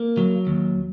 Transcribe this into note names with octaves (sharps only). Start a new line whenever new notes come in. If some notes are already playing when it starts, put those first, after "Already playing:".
Already playing: A#3
F#3
D#2